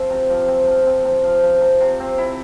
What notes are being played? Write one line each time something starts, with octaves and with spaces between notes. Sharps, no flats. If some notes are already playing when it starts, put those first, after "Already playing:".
Already playing: F3 C4
C3
F3
C4
F3
C4
C3
F3
F3
C3
C3
C4
E4